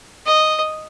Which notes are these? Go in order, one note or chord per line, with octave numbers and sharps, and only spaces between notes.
D#5